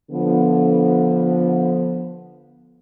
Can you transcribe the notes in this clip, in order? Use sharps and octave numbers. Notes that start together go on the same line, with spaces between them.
D3 F3 B3